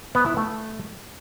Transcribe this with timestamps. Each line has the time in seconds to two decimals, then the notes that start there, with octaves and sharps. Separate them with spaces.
0.15 B3
0.26 E4
0.37 A3